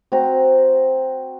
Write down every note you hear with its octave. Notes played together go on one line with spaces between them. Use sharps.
C4 F#4 A#5